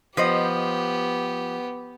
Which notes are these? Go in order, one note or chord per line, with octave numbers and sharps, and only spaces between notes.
F3 B3 G4 C5 D#5